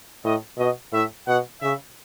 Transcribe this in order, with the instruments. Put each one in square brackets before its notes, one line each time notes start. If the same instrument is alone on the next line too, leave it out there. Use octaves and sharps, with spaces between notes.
[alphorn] A2 [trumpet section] D#5
[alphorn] B2 [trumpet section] D#5
[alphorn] A2 [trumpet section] E5
[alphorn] B2 [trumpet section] F#5
[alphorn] C#3 [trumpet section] E5